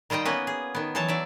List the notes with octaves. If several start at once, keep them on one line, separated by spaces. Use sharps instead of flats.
D#3 G3 F4 D#5 G5
A#3 B3 C#4 F#4 B4
G#4
D#3 B3
E3 F#3 C#5 A5
F#3 D5 E5